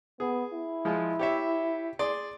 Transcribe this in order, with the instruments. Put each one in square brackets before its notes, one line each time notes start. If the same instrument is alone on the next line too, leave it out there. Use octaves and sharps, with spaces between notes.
[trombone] B3 [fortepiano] G#4
[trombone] E4
[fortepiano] F3 G#3 F4
G4 C#5 E5
G#4 D5 C6